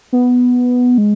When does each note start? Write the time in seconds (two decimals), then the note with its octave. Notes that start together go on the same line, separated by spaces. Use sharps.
0.13 B3
0.98 G#3